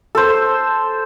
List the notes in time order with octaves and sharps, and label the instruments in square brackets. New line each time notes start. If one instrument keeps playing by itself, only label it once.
[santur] A4 C5